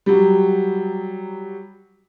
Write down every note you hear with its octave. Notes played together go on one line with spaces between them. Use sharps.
F#3 G3